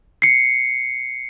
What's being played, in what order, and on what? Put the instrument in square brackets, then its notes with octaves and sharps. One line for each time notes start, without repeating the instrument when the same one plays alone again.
[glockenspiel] C7 C#7